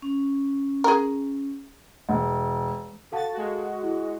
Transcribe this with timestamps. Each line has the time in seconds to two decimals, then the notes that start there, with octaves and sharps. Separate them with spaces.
0.02 C#4
0.84 G#4 A#4
2.09 E1
3.12 F#4 A4 F5 A5 A6
3.33 G#3 F#4
3.83 E4 G#4